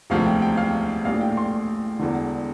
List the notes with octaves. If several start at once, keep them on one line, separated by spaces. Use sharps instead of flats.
E1 D2 C3 F3 F5
G5
G5
F5
A#1 A2 G3 F5
G5
C6
E1 E2 D3